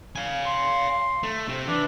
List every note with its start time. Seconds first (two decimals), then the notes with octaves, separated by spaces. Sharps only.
0.16 F5 G#5
0.46 C6
1.24 A3
1.48 C3 C4
1.68 E3 D4